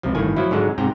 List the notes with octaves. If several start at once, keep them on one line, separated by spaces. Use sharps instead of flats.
C#2 C3 F3
G1 A2 D#3 G#5
F3 F#3 E4
G#2 D3 F#3 G#3
G#2 C3 G5 A#5